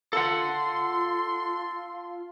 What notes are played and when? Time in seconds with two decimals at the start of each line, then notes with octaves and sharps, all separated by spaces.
0.13 F4 A4 F#5 C6